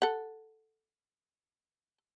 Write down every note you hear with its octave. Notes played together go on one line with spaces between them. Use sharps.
A4 F#5